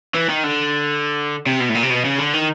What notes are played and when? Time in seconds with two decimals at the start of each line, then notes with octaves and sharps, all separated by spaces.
0.14 E3
0.29 D#3
0.44 D3
1.46 C3
1.60 B2
1.69 A2
1.75 A#2
1.83 C3
1.90 B2
2.05 C#3
2.19 D3
2.34 D#3